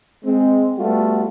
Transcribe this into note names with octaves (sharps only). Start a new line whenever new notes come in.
G#3 C4
G3 A3 B3 F4 F#4